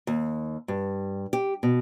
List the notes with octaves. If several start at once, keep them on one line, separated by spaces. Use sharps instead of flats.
D#2
G2
G4
B2